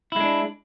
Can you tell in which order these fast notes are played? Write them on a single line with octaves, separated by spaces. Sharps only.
E4 G#3 D4